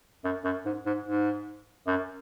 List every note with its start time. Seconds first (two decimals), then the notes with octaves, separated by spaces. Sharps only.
0.24 F#2
0.44 F#2
0.65 G#2
0.86 G#2
1.05 G#2
1.87 F#2